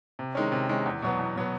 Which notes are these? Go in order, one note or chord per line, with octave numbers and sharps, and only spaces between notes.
C3
D#3 G#3 C#4
C3
D#3 G#3 C#4
E2
B2 F#3 B3
E2
B2 F#3 B3